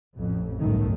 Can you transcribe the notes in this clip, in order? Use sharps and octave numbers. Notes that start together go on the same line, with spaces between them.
A1 F2
G1 C2 F#2 A2 D#3 A3